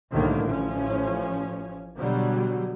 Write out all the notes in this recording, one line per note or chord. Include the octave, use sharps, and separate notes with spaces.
C2 A2 D3 D#3 A#3
A1 F3 C#4
B2 D3 F#3 G3